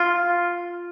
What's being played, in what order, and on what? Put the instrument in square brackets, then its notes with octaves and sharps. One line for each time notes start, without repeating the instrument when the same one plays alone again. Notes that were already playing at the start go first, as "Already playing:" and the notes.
Already playing: [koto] F4